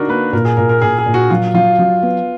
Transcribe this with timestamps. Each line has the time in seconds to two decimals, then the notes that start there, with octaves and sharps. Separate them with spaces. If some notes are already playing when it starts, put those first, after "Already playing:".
Already playing: D3 D4 D#4 F#4 A#4
0.09 A#3 B4
0.33 A#2 A#4
0.45 G#4
0.57 A#2 A#4
0.69 A#4
0.82 A#2 G#4
0.98 G#4
1.06 A#2
1.14 F#4
1.30 F#3 F4
1.54 F#3 F4
1.79 F#3
2.02 B3